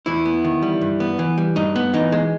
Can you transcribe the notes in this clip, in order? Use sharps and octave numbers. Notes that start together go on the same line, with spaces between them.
E2 E3 E4
B3
D#3
G3
G2
B3
E3
G3
G2 D#4
B3
E3 D#4
G#3